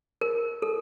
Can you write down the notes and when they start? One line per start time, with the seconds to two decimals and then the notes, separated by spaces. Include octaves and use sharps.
0.21 A#4
0.62 A4